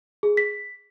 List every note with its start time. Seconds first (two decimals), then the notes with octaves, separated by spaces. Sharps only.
0.23 G#4
0.37 B6